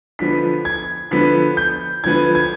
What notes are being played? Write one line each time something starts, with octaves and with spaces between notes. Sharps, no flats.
D3 F3 B3 B6
G#6
D3 F3 B3 B6
G6
D3 F3 B3 G#6
G#6